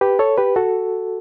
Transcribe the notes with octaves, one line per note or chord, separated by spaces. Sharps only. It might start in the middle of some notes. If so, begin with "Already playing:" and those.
G4 B4
A4 C#5
G4 B4
F#4 A4